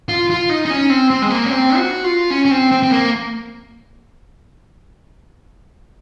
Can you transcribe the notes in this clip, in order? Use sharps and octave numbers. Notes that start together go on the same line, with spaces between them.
F4
F4
D#4
D#4
C#4
C4
C4
G#3
A#3
C#4
C4
F#4
F4
C#4
C#4
C4
C4
C4
A#3